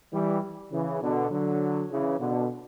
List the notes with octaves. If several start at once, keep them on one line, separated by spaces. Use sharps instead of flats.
E3 G3
C#3 E3
B2 D3
D3 F#3
C#3 E3
B2 D3